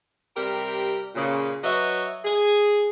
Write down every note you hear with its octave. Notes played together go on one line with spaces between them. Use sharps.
C3 G3 G4 A#4
A#2 C#3
F#3 B4 C#5 D#5 E5
G#4